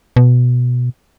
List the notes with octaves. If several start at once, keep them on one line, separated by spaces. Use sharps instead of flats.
B2